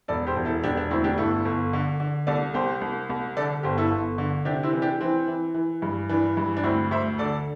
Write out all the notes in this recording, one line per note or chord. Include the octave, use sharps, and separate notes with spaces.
E1 A4 D5
G4 C5
E1
E4 A4
E1 D4 G4
D4
D2 C4 E4
D4 G4
G1 E4 A4
G1
D3
D3
C2 A4 D5
C2 G4 C5
C2
C2
D3 A4 D5
G1 G4 C5
E4 A4
G1
D3
C3 D4 G4
C4 E4
E3
D4 G4
E3 C4
E3
E3
G2
E3 D4
G2
D4
D2 C4 E4
D2 C5 E5
D3 A4 D5